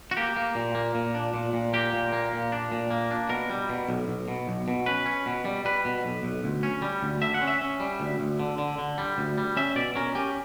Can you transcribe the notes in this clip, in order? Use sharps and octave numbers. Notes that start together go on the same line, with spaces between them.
F#4
A#3 G4
A#3
A#2
A#3
A#2
D4
A#2
A#2
A#3 G4
A#2
A#3
A#2
D4
A#2
A#3
D4
B2 A#4
G3
B2
B1
B1
B2
B1
B2
C#4 B4
C#4
B2
G3
G3 B4
B2
B1
B1
D2
C#4
G3
D2
D3 E5
F#5
C#4
E5
C#4
G3
D2
D2
D3
D3
D3
G3
D2
G3
C#4 E5
B2 D5
C#4 A#4
C#4 G4